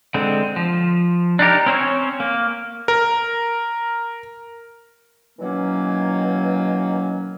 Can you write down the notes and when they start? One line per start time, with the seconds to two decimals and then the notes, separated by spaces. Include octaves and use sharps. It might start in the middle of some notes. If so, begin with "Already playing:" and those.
0.14 D3 G#3 C4
0.56 F3
1.39 D4 D#4 G4 A#4
1.66 C4 C#4 C5 C#5
2.20 A#3
2.88 A#4
5.39 B2 D#3 E3 F#3 A#3 C#4